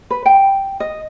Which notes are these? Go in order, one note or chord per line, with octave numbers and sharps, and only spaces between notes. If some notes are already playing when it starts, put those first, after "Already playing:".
B4
G5
D#5